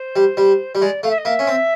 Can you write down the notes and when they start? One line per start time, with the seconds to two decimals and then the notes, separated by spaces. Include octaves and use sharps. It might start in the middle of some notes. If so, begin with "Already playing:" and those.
Already playing: C5
0.16 G3
0.37 G3
0.75 G3
0.81 G#3 D5
1.03 A3 F5
1.10 E5
1.18 D#5
1.25 A#3 E5
1.39 C#4
1.47 C4